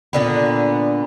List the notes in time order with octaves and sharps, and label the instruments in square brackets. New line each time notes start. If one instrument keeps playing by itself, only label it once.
[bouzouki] A#2 D3 B3